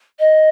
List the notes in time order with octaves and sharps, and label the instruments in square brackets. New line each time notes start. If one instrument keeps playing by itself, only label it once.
[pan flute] D#5